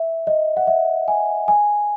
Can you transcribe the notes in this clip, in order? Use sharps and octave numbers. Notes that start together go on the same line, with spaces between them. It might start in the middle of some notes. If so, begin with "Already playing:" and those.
Already playing: E5
D#5
F#5
E5
G#5
G#5